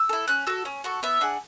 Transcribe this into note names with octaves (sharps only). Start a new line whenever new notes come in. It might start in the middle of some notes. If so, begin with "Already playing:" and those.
Already playing: E6
E4 A4
C#4 F#6
F#4 A4 E6
C#4
F#4 A4 C#6
B3 E5
D4 G#4 F#5